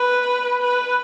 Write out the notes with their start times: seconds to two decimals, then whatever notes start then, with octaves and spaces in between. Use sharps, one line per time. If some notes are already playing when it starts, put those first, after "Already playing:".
Already playing: B4
0.62 B4